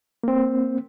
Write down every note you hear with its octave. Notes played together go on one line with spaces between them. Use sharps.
A#3 C4